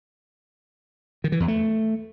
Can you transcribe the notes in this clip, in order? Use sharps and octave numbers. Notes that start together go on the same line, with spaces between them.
D#3
E3
E2
A3